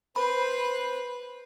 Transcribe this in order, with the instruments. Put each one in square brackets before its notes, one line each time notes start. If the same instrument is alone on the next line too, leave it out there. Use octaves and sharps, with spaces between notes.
[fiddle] B4 [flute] C5 [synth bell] B5